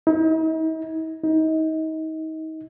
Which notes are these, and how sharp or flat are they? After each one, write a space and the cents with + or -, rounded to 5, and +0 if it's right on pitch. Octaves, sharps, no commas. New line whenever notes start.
D#4 +45
D#4 +30